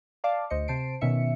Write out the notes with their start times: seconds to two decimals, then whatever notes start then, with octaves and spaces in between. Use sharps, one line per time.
0.24 D5 F5 A5 D6
0.50 D2 C5 D#5 C#7
0.68 C3 C5 A5 C7 D7
1.01 B2 D#3 C#4 E5 C#7